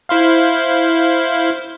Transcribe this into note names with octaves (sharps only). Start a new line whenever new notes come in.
E4 C5 F5